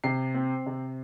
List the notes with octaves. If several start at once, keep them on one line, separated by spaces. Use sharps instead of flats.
C3 C7
C4
C3